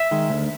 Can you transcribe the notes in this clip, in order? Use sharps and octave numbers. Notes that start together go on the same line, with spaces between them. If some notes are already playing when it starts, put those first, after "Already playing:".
Already playing: E5
D#3 G#3
D2